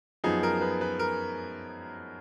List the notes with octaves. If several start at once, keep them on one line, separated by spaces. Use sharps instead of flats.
F#2 F3 B3 D#4 G#4
A#4
B4
B4
A#4